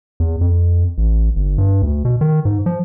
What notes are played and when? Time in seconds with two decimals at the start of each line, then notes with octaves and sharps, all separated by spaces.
0.20 E2
0.41 F2
0.98 A1
1.36 G1
1.58 G2
1.82 D2
2.05 B2
2.21 D#3
2.45 G#2
2.66 F3